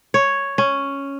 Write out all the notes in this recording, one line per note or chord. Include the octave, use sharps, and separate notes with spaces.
C#5
C#4